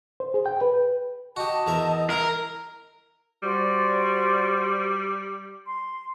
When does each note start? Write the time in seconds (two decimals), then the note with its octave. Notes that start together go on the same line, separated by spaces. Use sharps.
0.20 C5
0.34 G#4
0.46 G5
0.61 B4
1.36 F#4 G4 D#5 A5
1.67 E2 A#4 E5
2.10 E4 A#4
3.43 G3 F#4 C5 D5
5.67 C6